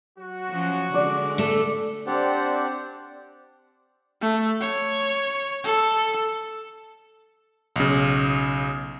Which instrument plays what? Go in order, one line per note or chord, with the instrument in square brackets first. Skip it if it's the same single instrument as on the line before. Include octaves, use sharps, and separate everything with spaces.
[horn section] F#3 F#4
[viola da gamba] F3 C#4
[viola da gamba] D3 G#3 D4 [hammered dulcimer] D5
[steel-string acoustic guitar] A3 A4
[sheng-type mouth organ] C4 D4 G4 C5 D5 F#5
[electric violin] A3
C#5
A4
[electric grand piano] B1 C#3